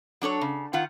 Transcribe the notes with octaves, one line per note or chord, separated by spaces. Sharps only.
F#3 D4 A4 C#5
C#3
D#3 F4 F#5